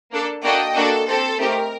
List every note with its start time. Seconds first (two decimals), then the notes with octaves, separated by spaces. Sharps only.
0.12 A#3 D4 A4
0.44 A#3 D4 F#4 A4 D#5 G5
0.76 A#3 D4 F#4 A4
1.07 C4 G4 A4 C5
1.39 A3 C4 D#4 G4 A#4